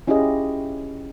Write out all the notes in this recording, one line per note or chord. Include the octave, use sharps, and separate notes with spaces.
C#4 E4 F4 G4 G#4 D#5